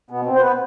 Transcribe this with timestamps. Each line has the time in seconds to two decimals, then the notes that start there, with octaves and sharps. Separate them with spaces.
0.10 B2 B3
0.26 C4
0.35 C5
0.41 B3 B4